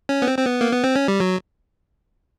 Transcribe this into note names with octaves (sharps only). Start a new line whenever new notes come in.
C#4
B3
C4
C4
B3
A#3
B3
C4
C#4
G3
F#3